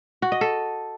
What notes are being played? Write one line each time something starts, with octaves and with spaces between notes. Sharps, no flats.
F#4
D#5
A4